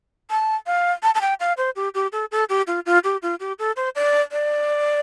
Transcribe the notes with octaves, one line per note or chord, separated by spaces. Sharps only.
A5
F5
A5
A5
G5
F5
C5
G4
G4
A4
A4
G4
F4
F4
G4
F4
G4
A4
C5
D5
D5